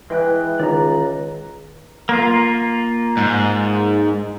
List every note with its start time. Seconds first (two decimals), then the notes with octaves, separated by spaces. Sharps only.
0.10 E3 G#3 G5 F#6
0.60 C#2 D#3 D5 A#5
2.09 A#3 F4
3.17 G#2